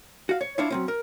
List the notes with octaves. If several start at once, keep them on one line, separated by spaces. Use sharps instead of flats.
F#4 F5
C#5
D4 E4 F4 C#5
F#3 C4 C#4
A#4